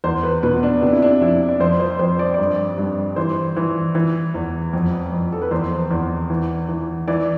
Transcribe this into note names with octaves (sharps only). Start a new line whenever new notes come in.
E2 C5
B4
B2 B4
D4
C3 D4
E4
D4
F2 E4
D5
F2 C5
C5
F2 C5
D5
G2 D5
G2
E3 C5
E3
E3
E2
F2
F2
A4
B4
E2 C5
E2
E3
E3
E3 D5